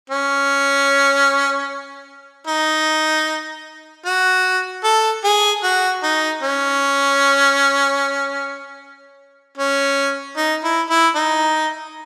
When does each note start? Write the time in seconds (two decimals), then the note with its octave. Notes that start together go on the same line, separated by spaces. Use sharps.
0.10 C#4
2.47 D#4
4.05 F#4
4.84 A4
5.24 G#4
5.63 F#4
6.03 D#4
6.42 C#4
9.57 C#4
10.37 D#4
10.64 E4
10.90 E4
11.15 D#4